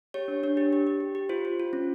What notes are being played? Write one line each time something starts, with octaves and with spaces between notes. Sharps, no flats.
G4 C#5
D4
D4 C#5
G4
G4
G4
G4
G4
F4 C5
F4
F4
C#4